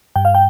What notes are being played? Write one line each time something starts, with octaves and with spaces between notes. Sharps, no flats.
G2 G5
F5
G5